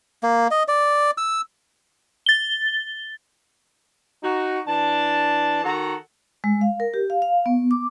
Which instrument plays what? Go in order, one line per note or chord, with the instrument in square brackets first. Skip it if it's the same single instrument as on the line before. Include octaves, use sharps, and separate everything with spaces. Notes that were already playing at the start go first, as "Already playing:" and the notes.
[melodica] A#3
D#5
D5
E6
[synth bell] A6 G7
[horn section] D#4 F#4
E3 D4 A5
D#3 F#4 A4 F#5 A#5
[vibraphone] G#3
F5
A#4
G4
F5
F5
B3
D6